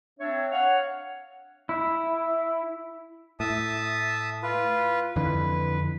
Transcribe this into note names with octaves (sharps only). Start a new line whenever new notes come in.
C4 D4 C#5 E5
C#5 F5 F#5
E4
A2 E5 A5 D#6
F4 B4
F2 D3 E3 B4